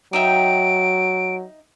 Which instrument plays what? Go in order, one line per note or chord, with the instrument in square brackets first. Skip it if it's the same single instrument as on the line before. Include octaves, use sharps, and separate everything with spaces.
[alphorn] F#3 [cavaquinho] D#4 E5 G5 [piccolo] D7